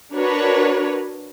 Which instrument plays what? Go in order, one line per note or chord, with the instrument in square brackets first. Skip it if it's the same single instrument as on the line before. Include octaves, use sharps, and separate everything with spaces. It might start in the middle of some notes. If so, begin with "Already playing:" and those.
[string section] D4 F#4 A#4 B4 C#5